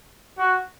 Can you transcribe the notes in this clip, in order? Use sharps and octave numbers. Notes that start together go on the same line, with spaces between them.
F#4